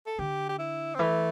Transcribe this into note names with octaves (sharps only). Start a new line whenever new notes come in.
A4
D3 G4
G4
E4
C4
E3 A3